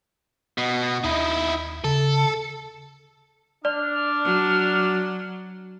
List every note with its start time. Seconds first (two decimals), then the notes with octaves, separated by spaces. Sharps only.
0.58 B2
1.04 D#2 D#4 E4
1.84 C#3 A4
3.65 D4 D5 F6
4.24 F#3